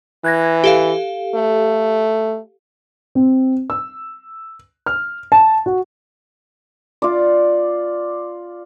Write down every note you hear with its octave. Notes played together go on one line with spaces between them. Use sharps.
E3 F#6 G#6 A#6
G4 A4 F5
A3
C4
E6
F6
A5
F#4
F4 D5